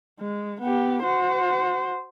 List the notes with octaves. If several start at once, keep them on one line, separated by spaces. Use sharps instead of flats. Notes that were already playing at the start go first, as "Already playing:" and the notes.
G#3
B3 G4
F#4 C5